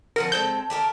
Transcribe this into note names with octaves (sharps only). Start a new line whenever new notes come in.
F3 C4 A#4 F#5
G#3 C4 A4 G6
G4 A4 A#4